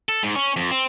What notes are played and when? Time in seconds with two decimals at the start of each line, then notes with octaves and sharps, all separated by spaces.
0.09 A4
0.23 G#2
0.35 C#4
0.56 F2
0.71 C4